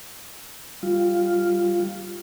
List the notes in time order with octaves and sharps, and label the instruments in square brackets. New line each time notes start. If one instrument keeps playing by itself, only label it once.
[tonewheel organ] G3 F4